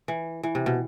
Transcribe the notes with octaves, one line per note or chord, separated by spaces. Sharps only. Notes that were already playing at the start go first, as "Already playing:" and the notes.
E3
E3
C3
B2